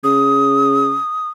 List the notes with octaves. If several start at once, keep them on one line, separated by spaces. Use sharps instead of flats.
C#3 D#6